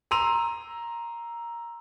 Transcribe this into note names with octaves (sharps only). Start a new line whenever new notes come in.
A#5 C6 E6 D#7 F7